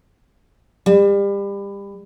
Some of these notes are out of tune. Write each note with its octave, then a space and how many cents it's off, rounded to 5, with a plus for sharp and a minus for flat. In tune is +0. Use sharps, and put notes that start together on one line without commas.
G3 +30